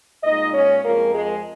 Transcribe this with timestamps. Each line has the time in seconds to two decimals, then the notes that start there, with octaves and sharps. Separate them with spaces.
0.23 A#2 G#3 D#4 D#5
0.53 C#4 C#5
0.84 F2 F3 G#3 A#3 A#4
1.14 G#3 G#4